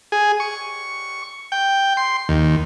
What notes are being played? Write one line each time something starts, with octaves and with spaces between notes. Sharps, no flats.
G#4
C#6
G5
C6
D#2